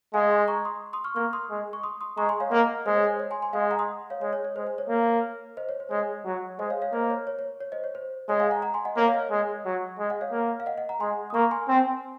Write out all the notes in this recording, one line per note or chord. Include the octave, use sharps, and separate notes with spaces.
G#3 F5 G#5
G#5 C6
A#5 C#6
C6 D#6
C6 D#6
C#6 F6
A#3 C#6 F6
C6 D#6
G#3
C#6
C6 D#6
C6 D#6
G#3 A#5 C#6
G#5 C6
C#5 F5
A#3 D#5 F#5
G#3 C5
C#5
C5
C#5
G#5 C6
G#5 C6
G#3 F5 G#5
F#5 A#5
C6 D#6
C#5 F5
G#3 C#5
C#5
C#5
G#3 C5
C5
C#5
A#3
C5 D#5
C#5
C5
G#3 C#5
F#3
G#3 C5 D#5
C#5 F5
C#5 F5
A#3 C5 D#5
C#5
C#5
C#5
C#5
C5 D#5
C#5
C5
G#3 C#5
F5 G#5
F#5 A#5
F#5 A#5
G#5 C6
D#5 F#5
A#3 C#5 F5
C#5 F5
D#5
C#5
G#3
F#3
G#3
D#5 F#5
C#5 F5
A#3
F5
D#5 F#5
D#5 F#5
F#5 A#5
G#3 G#5 C6
D#6
A#3 A#5 C#6
G#5 C6
C4